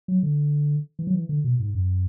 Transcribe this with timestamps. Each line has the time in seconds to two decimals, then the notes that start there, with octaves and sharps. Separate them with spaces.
0.08 F#3
0.23 D3
0.99 E3
1.07 F#3
1.14 E3
1.29 D3
1.44 B2
1.60 G#2
1.75 F#2